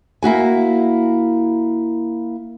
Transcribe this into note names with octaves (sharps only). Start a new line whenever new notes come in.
A#3 E4 F#4 G#5